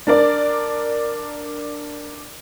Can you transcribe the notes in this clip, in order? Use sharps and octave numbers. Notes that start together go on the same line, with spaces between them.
D4 A#4 D5